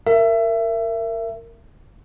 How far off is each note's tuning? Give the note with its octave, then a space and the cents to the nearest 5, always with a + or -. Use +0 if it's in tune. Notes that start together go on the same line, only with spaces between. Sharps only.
A#4 -20 E5 +25